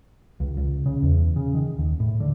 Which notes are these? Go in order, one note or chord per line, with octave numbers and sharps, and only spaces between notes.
C#2
C#2
C#3
E2
C#3
D#3
D#2
A2
D3